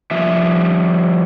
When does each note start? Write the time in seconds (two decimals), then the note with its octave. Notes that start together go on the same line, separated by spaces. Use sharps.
0.11 F3 G3 E5